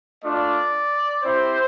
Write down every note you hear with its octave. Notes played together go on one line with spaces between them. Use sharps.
A3 D4 F4 D5
C4 E4 G4 C5